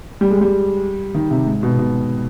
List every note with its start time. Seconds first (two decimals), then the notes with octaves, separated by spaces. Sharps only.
0.21 G3
0.31 G#3
0.41 G3
1.14 D#3
1.31 C3
1.46 G#2
1.63 B2
1.79 B2